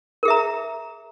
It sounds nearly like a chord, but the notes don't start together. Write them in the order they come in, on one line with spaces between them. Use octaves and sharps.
A#4 G#4 E5 A#5